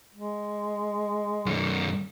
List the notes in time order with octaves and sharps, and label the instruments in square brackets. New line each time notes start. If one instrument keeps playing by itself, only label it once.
[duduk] G#3
[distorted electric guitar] F#2 D#3